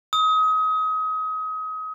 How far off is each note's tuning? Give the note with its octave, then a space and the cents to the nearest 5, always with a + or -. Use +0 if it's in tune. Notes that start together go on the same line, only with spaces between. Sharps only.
D#6 +30